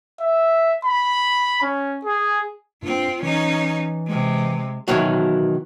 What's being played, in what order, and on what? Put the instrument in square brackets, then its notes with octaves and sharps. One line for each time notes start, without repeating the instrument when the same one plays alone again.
[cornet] E5
B5
C#4
G#4
[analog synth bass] G2 [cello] C4 F4
[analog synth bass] E3 [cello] C#4 D#4
[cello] C3 G#3
[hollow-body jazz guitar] B2 D#3 E3 F#3